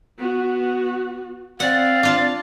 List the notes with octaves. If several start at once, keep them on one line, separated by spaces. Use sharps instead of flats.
B3 F#4
C4 D5 F5 F#5
D4 F4 A5